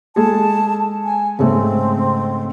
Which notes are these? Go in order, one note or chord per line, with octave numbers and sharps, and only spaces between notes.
G#3 G#4 A4 A5
G#5
G#2 C#3 A3 C4